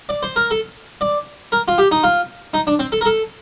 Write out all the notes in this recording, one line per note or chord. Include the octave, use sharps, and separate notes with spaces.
D5
C5
A#4
A4
D5
A#4
F4
G4
D#4
F4
D#4
D4
C4
A4
A#4
A4